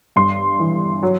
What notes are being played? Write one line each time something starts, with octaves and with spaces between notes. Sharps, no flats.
G2 C6
E3
F#3